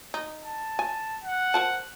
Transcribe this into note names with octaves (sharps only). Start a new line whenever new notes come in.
D#4
A5
G#5
F#5
A#4 C5 A5